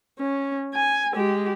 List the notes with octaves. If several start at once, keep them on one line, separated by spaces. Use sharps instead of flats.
C#4
G#5
G#3 G4